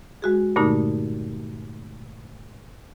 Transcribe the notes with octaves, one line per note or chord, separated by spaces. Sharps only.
G#3 F#4 G#4
G2 A#2 D3 A3 A#3 D#4